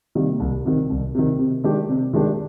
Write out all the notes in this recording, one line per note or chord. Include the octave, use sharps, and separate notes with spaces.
C3 D#3 G3 A#3
C2
C3 D#3
C2
C3 D#3
C3
D#3 G#3 D4 G4
C3
D#3 G#3 D4 G4